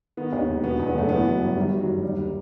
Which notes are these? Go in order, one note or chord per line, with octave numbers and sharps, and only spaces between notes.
D#3 B3
D#2
E1
B2 B3
E2
B3
F#1 A3
E3 B3
F#2
G1
D#3 G3
F#2
F#3
G1
D#2 G3
D#3